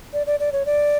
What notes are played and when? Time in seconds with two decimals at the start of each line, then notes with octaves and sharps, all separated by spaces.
0.13 D5
0.27 D5
0.40 D5
0.52 C#5
0.66 D5